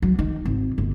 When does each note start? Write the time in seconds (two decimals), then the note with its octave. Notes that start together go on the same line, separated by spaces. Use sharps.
0.02 F#3
0.19 D#3
0.45 G#1
0.78 G1